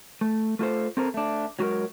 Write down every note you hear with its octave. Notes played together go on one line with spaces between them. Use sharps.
A3
A3 F4 A4 C5
C4 A4 A#4 C5
A3 D4
F#3 G#3 F#4 G#4 A#4